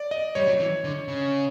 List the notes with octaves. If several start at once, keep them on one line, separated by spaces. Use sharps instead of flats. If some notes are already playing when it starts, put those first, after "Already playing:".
Already playing: D5
D#5
G3 C#5
F#3
E3
D3
C#3